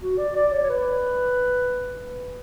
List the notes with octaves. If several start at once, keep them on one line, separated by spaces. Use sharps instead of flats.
F#4
D5
D5
C#5
C#5
B4